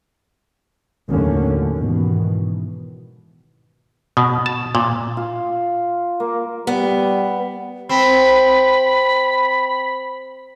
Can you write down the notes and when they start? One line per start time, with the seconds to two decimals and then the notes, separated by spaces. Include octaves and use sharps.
1.08 D#2 A2 D3 F#3 A3 C#4
1.74 G#2 B2 D#3 E3
4.17 B2
4.46 A5
4.75 A#2
5.17 F4
6.20 A#3
6.67 G3 B3
7.89 C4 B5